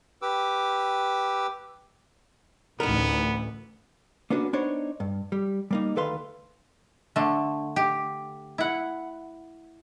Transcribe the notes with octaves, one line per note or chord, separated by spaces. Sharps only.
G4 B4 D6 E6
A1 D2 B3 D#4 A#4
A#3 B3 C#4 D4 F#4
B3 D4 D#4 C5 C#5
G2
G3
G3 A#3 D#4
D2 D#3 A4 B4 F5 C6
D3 A3
G4
E4 F#5